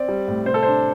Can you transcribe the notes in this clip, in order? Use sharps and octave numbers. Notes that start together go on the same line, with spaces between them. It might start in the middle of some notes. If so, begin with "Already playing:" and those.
Already playing: C4 D5
G3
A2
C3 C5
A4
D4 C5